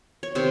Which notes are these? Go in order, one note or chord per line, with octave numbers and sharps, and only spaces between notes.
C#5
C3 D#3 C5